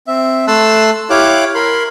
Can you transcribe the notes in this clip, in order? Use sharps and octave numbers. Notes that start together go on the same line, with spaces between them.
C4 E5
A3 A5 C6 E6 F#6
E4 G4 C#5 F5 D6 F#6
A#4 B5 C6